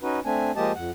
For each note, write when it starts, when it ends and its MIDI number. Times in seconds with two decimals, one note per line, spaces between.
0.02 0.20 61
0.02 0.20 63
0.02 0.20 66
0.02 0.20 71
0.25 0.51 57
0.25 0.51 60
0.25 0.51 62
0.25 0.51 80
0.56 0.72 53
0.56 0.72 56
0.56 0.72 58
0.56 0.72 67
0.56 0.72 75
0.56 0.72 81
0.76 0.91 41
0.76 0.91 78